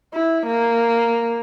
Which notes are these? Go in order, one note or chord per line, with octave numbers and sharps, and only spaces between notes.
E4
A#3